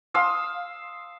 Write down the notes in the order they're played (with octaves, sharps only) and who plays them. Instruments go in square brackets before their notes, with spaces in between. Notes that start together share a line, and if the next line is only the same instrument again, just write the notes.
[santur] F5 C6 D#6 E6